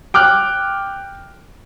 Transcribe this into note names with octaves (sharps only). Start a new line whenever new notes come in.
G5 D6 F6 F#6